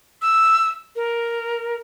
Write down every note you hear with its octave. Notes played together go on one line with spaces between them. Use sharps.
E6
A#4